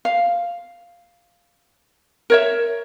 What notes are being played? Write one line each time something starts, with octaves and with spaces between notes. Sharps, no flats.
F5
A#4 C#5 E5